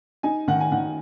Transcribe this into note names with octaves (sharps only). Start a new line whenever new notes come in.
D#4 G#5
D#3 F#5
G#5
D#3 F#5